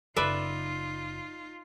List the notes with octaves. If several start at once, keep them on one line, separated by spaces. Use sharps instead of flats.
F#1 D#4 F4 B4 D5 E5